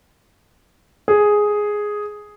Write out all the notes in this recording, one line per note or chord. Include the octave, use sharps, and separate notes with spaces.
G#4